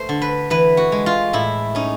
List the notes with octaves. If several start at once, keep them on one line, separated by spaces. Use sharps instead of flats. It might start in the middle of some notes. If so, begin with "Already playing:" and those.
Already playing: A3 C5
D3
B4
E3 B4
F#4
G#3
F4
A2 E4
C#4 D#4